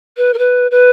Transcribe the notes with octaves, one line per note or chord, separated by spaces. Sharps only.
B4
A#4
B4
B4